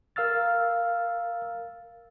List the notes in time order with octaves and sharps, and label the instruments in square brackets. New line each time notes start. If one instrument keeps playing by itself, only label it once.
[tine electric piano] A#4 F5 E6 F6 A6